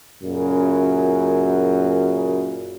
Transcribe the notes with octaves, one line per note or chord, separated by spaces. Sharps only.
F#2 A#2 C#3